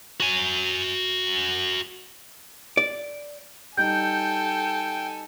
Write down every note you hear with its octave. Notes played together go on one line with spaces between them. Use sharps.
F#4 G#5
D5
G3 D#4 A4 G5 G#5 G6